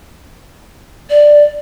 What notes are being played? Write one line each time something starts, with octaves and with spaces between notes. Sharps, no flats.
D5